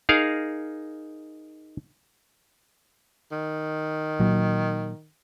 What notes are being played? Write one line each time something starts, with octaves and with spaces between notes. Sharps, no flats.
D#4 G#4 A#4 F5
D#3
A#2 F#3